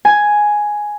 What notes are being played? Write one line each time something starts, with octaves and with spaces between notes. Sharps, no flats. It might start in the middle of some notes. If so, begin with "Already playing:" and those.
G#5